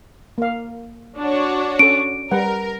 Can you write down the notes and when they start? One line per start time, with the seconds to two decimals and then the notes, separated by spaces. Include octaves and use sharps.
0.38 A#3 F5
1.19 D4 F#4 C#5
1.79 C#4 A4 D7
2.31 G3 A#4 B4 F#5